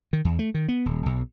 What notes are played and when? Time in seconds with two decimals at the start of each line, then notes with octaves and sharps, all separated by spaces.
0.13 D#3
0.25 E2
0.39 A3
0.54 D#3
0.68 B3
0.86 D#1
1.06 B1